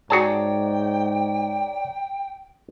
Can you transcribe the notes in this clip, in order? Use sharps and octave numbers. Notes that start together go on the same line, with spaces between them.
G#2 F#4 G#4 C#5 D5 G5 A5 A#5